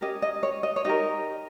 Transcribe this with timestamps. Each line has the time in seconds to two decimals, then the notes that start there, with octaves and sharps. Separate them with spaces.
0.01 C#4 G4 A#4 D#5
0.22 D#5
0.43 C#5
0.63 D#5
0.76 C#5
0.85 D#4 G4 A#4 D#5